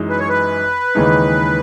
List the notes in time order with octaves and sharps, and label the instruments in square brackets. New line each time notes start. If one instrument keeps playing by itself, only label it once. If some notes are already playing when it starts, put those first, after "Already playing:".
Already playing: [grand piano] F#2 E3 G#3 D#4
[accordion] B4
C#5
B4
[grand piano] D#2 C#3 E3 G#3 D#4